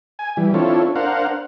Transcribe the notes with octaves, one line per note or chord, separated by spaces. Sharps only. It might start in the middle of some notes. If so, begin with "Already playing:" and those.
G#5
E3 G3
C4 D4 E4 F4 A4 C#5
D4 A#4 C5 F5 F#5